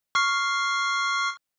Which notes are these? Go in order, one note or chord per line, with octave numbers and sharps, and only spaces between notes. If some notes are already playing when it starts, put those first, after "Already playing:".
C#6 F6 C7